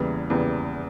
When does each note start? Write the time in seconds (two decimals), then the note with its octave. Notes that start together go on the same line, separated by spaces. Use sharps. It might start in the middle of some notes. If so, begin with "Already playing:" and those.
Already playing: E2 C#3 E3 G3 A#3
0.30 E2 C#3 E3 G3 A#3